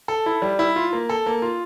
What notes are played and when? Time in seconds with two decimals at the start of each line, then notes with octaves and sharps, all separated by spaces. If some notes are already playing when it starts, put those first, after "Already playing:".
0.08 A4
0.26 E4
0.42 G3
0.59 E4
0.76 F4
0.93 A#3
1.09 A4
1.26 A#3
1.42 F4